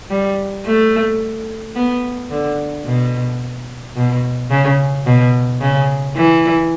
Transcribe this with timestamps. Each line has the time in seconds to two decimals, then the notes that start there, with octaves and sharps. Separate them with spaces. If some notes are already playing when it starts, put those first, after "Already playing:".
0.10 G3
0.65 A3
1.76 B3
2.31 D3
2.86 B2
3.96 B2
4.51 C#3
5.06 B2
5.61 C#3
6.16 E3